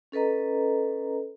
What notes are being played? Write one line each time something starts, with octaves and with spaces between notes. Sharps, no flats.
C#4 A4 B4 D#5 A#5